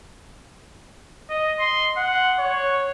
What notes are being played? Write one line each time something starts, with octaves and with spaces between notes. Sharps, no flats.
D#5
C6
F#5
C#5